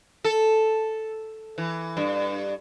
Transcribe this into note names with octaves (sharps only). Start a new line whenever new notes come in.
A4
E3
G2